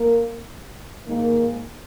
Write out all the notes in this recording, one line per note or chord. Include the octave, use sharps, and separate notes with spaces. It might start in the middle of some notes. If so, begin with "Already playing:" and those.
Already playing: A#3 A#4
G#2 D#3 A#3